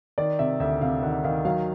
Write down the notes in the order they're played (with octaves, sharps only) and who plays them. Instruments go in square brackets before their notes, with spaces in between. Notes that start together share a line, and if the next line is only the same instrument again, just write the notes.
[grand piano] D#3 [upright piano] D5
[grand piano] C3 [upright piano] E5
[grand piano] D2 [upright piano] E5
[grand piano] C3 [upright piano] F5
[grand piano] D#3 [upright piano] F#5
[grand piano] D#3 [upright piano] F5
[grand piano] F#3 [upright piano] F5